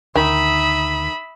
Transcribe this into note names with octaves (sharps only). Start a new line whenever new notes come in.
D2 D#3 E5 B5 D#6